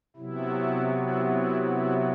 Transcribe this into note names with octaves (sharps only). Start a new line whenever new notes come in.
C3 F#3 B3 E4
E4
E4
E4